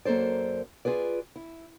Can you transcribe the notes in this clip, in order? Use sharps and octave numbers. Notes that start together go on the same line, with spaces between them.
F#2 A#3 A4 C5 D5
F4 G#4 B4 D5
E4